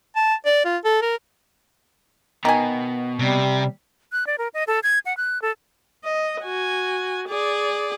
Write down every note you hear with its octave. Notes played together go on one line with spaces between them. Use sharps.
A5
D5
F4
A4
A#4
B2 D#3 G#5
C3 G3
F#6
D5
A#4
D#5
A4
G#6
F#5
F#6
A4
D#5
F#4 G#5
G#4 D5